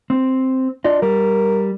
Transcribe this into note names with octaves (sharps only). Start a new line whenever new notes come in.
C4
D4 F4 D#5
G3 A#4